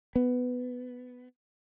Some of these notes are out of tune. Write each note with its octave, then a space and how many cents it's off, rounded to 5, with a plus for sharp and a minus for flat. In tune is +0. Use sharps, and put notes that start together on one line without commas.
B3 +10